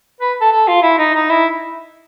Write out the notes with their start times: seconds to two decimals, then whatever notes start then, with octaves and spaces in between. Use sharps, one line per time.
0.21 B4
0.41 A4
0.51 A4
0.67 F4
0.83 E4
0.98 D#4
1.15 D#4
1.30 E4